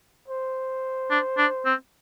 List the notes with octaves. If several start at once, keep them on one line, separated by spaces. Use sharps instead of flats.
C5
D4
D4
C4